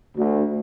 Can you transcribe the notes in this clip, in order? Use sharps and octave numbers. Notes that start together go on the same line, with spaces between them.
D2